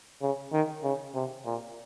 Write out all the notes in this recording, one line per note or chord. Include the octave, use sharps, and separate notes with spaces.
C#3
D#3
C#3
C3
A#2